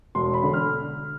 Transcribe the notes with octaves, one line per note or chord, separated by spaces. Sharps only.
E1 C6
B5
D3
F6